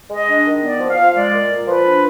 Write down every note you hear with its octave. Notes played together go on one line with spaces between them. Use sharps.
G#3 D#5
D4
D#3
B3 D5
F3
F5
F3
G#3 D5
A#2
A#2
F3 B4
D4